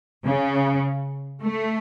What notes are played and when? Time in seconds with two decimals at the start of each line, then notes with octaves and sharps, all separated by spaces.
0.24 C#3
1.43 A3